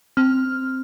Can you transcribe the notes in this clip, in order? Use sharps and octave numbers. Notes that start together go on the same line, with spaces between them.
C4 F6